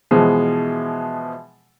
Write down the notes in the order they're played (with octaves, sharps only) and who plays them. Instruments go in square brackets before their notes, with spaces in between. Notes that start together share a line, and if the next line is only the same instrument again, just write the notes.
[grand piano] B2 E3 F3 G#3